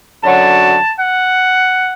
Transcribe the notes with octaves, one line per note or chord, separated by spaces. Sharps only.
F#2 D3 F#3 A5
F#5